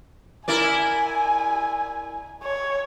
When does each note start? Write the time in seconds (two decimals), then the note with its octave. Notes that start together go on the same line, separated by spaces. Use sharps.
0.48 E4 A#4 D5 G#5
2.44 C#5